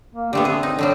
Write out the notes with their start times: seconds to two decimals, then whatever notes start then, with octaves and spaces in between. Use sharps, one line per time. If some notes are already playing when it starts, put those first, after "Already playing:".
0.15 A#3
0.33 D3 A3 B3 G4
0.45 C4 G#4
0.63 D#4
0.79 D3 F#3 G3 A4